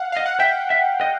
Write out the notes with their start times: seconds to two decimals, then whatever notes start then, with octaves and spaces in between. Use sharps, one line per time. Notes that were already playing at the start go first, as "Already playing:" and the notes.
Already playing: F5 F#5
0.12 D#5 F5
0.26 F#5
0.39 E5 G5
0.70 E5
1.01 D#5